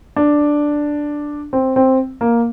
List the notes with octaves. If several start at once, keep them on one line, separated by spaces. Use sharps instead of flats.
D4
C4
C4
A#3